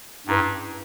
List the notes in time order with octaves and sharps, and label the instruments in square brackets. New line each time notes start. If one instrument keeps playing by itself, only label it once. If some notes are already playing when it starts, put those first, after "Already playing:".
[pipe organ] G2 [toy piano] C#4 E4 G#4 B4